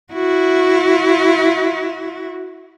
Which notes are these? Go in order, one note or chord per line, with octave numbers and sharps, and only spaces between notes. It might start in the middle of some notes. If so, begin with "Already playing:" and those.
E4 F#4